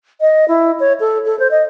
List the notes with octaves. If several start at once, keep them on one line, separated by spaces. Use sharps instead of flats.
D#5
E4
C#5
A4
A4
C5
D#5